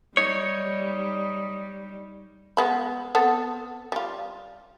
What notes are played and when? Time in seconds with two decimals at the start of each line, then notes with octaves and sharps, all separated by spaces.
0.17 G3 D#4 C#5
2.57 G#3 B3 B5
3.15 B3 C4 A4
3.92 G3 F4